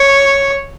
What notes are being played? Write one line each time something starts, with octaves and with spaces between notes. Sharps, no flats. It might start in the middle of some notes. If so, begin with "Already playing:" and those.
Already playing: C#5